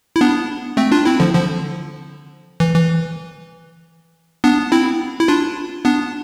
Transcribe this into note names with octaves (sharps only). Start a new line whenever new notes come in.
E4
B3 D4
A3 C4
D4 F4
C4 E4
D3 F3
D3 F3
E3
E3
B3 D4
C4 E4
E4
D4 F4
B3 D4